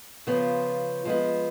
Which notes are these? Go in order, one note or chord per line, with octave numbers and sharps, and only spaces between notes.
C#3 F3 B3 F4
F3 G#3 B3